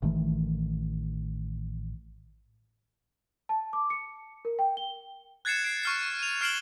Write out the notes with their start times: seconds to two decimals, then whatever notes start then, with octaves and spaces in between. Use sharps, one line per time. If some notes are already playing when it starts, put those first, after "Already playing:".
0.02 A1 D#3 E3 A3
3.49 A5
3.73 D6
3.90 C#7
4.45 A#4
4.59 G5
4.77 G7
5.45 F#6 G#6 A6 C7 C#7 E7
5.64 C7 D7
5.83 C#6 F6 C7
6.19 D#7 F7
6.41 F6 C7 D7 E7 F#7 G7